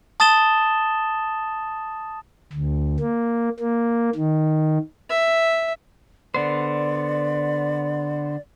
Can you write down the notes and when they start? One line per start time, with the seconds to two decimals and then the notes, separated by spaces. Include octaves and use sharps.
0.20 A5 D#6 A6 E7 G7
2.52 D2
3.00 A#3
3.60 A#3
4.15 D#3
5.09 E5
6.34 D3 B3 C5 D5